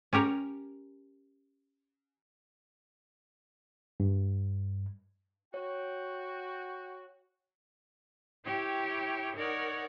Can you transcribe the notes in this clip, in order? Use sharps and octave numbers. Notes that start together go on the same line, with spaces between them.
C#4 G4 A#4 C#5
G2
F#4 C#5 G5
E4 G4 C#5 G5
D#4 A#4 C#5 D5 F#5